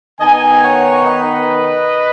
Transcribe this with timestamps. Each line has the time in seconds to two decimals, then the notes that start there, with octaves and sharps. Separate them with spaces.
0.19 D#3 B3 D#4 D#5 G#5
0.63 C#5 F#5
1.05 B4 D#5